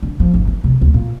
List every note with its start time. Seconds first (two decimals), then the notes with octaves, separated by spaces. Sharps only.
0.03 D3
0.20 F3
0.34 G1
0.47 E3
0.64 C3
0.81 D2
0.94 A#2